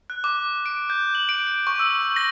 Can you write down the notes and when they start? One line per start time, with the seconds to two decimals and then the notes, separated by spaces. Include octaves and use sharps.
0.10 F#6
0.24 D6
0.66 D7
0.90 G6
1.15 F#7
1.29 D7
1.47 D7
1.67 C#6
1.79 E6
2.01 C#6
2.16 A#6